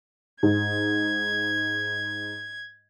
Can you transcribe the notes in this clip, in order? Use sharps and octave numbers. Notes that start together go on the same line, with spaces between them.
G#2 G#6